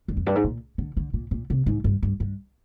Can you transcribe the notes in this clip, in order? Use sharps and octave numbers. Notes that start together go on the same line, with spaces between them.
G2
F2
G2
G#2
A#2
D3
D3
A#2
A#2
C3
G#2
G2
G2
G2